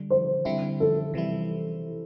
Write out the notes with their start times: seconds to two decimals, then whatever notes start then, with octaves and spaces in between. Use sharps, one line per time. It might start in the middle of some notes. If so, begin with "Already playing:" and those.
Already playing: D3 G3
0.10 C5
0.45 D3 G3 C4 E4
0.80 A4
1.14 C3 E3 G3 E4